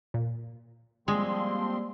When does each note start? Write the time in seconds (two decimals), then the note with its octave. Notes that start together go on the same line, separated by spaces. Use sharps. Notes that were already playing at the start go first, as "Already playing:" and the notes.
0.14 A#2
1.08 F3 G3 G#3 A#3 C4 C6